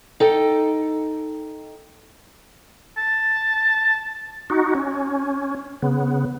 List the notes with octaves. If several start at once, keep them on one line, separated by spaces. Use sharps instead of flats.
D#4 A4 G5
A5
D#4 F#4
C#4
C#3 B3